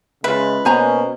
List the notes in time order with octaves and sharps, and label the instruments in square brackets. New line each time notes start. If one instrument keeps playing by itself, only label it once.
[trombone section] C#3 G#3 [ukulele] F4 E5 [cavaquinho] B4
[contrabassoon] B2 [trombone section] A#3 C#4 [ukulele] C5 G#5 A#5